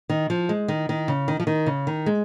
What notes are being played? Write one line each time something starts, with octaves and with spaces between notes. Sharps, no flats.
D#3
F3
G#3
D#3
D#3
C#3
D#3
F3
D#3
C#3
D#3
G#3